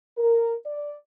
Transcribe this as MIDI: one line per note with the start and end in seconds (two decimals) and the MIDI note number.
0.17 0.52 70
0.64 0.95 74